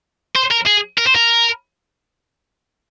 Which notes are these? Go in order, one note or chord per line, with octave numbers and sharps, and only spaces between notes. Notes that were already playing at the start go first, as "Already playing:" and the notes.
C5
A#4
G#4
A#4
C5
A#4